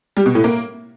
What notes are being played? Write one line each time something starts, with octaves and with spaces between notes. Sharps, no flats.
G3
B2
A2
A#3